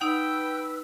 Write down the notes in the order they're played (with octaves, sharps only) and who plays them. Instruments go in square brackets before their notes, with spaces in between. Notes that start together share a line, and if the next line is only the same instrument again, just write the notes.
[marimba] D#4 F#5 [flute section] B4 E6 [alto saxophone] G5